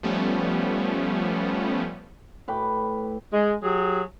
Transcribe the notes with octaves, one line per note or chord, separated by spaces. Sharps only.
F3 G3 A3 B3 C#4
A2 B4 G5 D6
G#3
F#3 G4 G#4